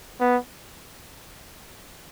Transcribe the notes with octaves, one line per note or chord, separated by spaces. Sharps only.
B3